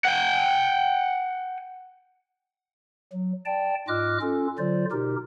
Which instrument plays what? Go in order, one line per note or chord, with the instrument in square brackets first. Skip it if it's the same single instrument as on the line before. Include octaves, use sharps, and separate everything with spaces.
[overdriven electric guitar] F#5 G5
[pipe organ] F#3
D5 G5 A5
G#2 F4 D#5 D6 F6 F#6
C#4 F4 A4
D3 F#3 F4 C5 D5
B2 D#4 G4 A#4